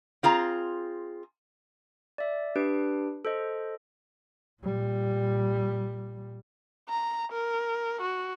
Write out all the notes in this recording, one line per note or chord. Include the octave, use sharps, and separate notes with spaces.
C4 F4 G#4 A#5
D5 E5
D4 G4 B4 D7
A4 C5 D#5
A#2 G3
A#5
A#4
F#4